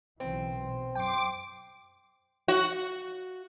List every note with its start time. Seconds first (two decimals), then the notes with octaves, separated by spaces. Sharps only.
0.20 B1 C#3 E3 C4
0.58 B2
0.95 F#2 G5 C6 D6
2.48 F#4